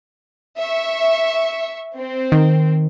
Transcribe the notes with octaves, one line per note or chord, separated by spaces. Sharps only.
E5 C#6
C4
D#3